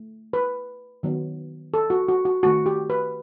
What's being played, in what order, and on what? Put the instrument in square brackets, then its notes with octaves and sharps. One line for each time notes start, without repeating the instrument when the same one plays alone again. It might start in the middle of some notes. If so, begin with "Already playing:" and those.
Already playing: [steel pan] A3
B4
D#3 F#3 B3
A4
F#4
F#4
F#4
D#3 A3 C4 F#4
G4
B4